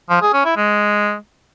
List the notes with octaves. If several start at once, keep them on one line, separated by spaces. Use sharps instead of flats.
F3
G#4
C#4
E4
G#3